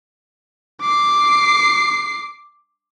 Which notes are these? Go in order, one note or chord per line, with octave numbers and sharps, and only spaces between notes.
D6 C7